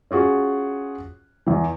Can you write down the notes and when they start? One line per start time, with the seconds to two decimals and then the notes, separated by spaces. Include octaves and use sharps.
0.11 C#4 F4 F#4 G#4
1.46 E2 E3